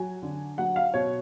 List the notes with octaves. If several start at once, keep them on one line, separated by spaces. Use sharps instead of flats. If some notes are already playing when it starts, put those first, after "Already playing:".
Already playing: F#3 G#5
D3
F#3 F#5
F5
B2 C#5